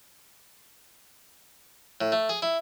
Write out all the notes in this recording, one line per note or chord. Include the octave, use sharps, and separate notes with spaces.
A2
A3
G#4
E4